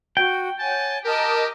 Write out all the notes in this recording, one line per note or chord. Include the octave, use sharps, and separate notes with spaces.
F#4 G5
C#5 F#5 G#5 A5
G4 A#4 D#5 A5 D6